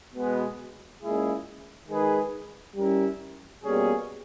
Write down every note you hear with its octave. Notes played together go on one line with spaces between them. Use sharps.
B2 G#3 B3
A#2 G#3 C#4 E4 G#4
D#3 G#3 D#4 G#4 B4
G3 C#4 E4 A#4
B2 G3 A#3 C#4 G#4